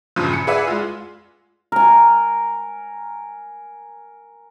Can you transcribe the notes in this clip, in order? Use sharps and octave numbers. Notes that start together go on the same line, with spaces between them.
E2 G2 A#2 C#3 F3
C#7
G#4 B4 D5 E5 F#5 G#5
G#3 F4
A#4 G#5